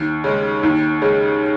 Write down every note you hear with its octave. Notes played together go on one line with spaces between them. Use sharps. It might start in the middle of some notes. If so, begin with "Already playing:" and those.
Already playing: D#2
C#3 G#3
D#2
C#3 G#3